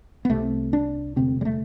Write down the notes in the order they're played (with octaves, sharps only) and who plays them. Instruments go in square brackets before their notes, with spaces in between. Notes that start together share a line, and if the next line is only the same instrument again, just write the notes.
[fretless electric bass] B3
C2 C3 A3
D4
E1 D2 C3 C4
G3
A3